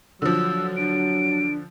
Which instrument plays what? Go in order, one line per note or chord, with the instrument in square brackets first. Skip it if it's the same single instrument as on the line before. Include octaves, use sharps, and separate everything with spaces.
[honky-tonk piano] D3 F3 [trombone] F#3 [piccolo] E6
[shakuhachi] D4 [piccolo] D7